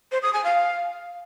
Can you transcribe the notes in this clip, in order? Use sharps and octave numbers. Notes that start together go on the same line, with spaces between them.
C5
D#6
G#5
F5